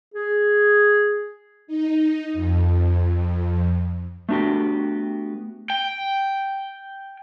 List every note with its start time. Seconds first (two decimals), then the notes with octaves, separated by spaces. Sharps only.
0.14 G#4
1.67 D#4
2.33 F2
4.29 A3 B3 D4 F#4 G4
5.70 G5